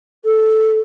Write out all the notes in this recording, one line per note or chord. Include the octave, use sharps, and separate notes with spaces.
A4